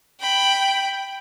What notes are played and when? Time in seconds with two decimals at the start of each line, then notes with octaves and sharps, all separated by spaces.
0.20 G5 B5